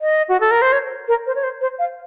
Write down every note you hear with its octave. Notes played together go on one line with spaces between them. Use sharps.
D#5
F#4
A4
A#4
C5
C#5
A#4
C5
C#5
C5
C5
F5